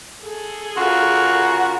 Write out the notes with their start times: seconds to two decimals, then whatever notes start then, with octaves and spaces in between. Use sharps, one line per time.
0.24 G#4 A4
0.77 C#3 F4 F#4 A#4